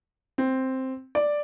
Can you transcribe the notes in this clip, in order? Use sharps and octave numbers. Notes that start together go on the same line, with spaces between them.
C4
D5